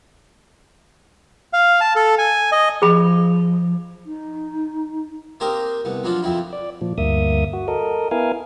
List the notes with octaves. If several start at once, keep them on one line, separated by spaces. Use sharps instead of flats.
F5
A5
A4
G#5
D#5
F3 G#4 B5
D#4
A#3 C4 G4 A#4 C5 D#5
C2 B3
F3 F#3 D4 F4
F2 F3 C4 E4
D5
A#2 F3
D2 G2 A#3 E5 D#6
F#4
A4 A#4 D#5
B3 E4 A#4 F5 G#5